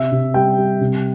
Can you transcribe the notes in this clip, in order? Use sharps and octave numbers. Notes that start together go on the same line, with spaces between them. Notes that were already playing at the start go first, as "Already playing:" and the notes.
Already playing: C3 E5
C3
G3 G5
G3
C3